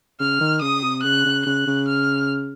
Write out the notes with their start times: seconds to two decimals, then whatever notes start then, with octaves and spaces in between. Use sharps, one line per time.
0.20 C#3 F6
0.40 D#3
0.62 C#3 D#6
0.83 C3
1.03 C#3 F#6
1.25 C#3
1.46 C#3 F#6
1.67 C#3
1.88 F6